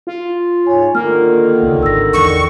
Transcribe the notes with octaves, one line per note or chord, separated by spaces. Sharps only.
F4
G#2 C#5 G#5
D3 D#3 A#3 F4 F6
C#2
G#1 E6 A#6
E2 C#6